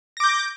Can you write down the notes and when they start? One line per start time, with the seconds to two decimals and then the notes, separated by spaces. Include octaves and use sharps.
0.17 A#6
0.20 D6
0.23 G6